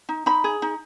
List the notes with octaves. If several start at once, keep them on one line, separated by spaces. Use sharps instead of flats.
D#4
D#4 B5
G#4
D#4